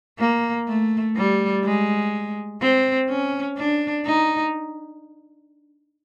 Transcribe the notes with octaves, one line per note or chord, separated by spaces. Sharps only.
A#3
A3
G3
G#3
C4
C#4
D4
D#4